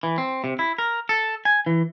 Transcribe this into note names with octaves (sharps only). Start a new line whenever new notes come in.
E3
C4
C3
E4
A#4
A4
G#5
E3